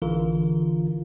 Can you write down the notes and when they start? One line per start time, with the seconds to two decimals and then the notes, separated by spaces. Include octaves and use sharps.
0.02 A#1 D3 E3 F4 A#4 F5